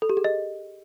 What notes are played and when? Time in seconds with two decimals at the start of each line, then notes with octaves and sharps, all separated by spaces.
0.02 A4
0.09 G4
0.17 G#4
0.24 D#5